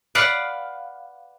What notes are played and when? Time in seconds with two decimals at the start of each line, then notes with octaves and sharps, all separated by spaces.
0.15 B4 D5 F5 F#5